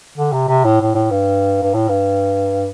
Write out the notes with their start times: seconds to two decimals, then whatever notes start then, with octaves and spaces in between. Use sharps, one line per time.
0.18 D3
0.33 C3
0.48 C3
0.65 A2
0.81 A2
0.95 A2
1.11 G2
1.63 G2
1.74 A2
1.89 G2